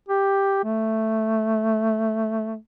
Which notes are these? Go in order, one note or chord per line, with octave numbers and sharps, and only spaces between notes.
G4
A3